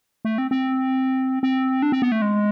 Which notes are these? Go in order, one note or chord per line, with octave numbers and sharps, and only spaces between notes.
A3
C4
C4
C4
D4
C4
B3
A3
G#3